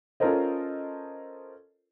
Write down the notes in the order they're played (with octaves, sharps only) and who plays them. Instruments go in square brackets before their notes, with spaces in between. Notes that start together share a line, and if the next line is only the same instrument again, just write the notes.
[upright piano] C#4 F4 A4 A#4 C5 D#5